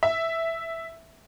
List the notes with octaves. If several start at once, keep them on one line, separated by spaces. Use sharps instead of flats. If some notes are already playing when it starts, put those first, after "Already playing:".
E5